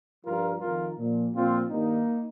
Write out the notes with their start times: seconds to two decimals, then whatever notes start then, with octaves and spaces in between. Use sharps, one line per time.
0.24 G2 F3 F4 A#4
0.61 F2 D#3 F4 A#4
0.97 A#2 F3
1.33 A#2 F3 C4 F4
1.69 G2 D#3 A#3 D#4